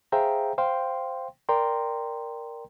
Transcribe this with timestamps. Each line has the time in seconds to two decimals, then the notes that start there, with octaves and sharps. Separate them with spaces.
0.12 G#4 C5 E5 F5 G5 A#5
0.58 C5 F5 G5 C6
1.49 A#4 D5 G5 A#5 C6